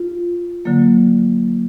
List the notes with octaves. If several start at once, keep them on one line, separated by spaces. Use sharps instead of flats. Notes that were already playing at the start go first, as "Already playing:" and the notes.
Already playing: F4
D3 F#3 A#3